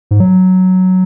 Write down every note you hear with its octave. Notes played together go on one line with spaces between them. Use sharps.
G#2
F#3